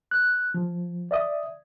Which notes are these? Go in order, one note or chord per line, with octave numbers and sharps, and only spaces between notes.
F#6
F3
D5 E5 D#6